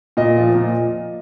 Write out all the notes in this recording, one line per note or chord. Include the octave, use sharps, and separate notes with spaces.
A#2 D#5
F3
A#2